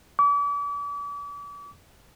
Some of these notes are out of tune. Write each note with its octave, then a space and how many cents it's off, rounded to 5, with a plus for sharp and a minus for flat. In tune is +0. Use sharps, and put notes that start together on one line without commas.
D6 -40